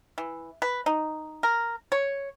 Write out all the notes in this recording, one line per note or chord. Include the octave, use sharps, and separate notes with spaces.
E3
B4
D#4
A#4
C#5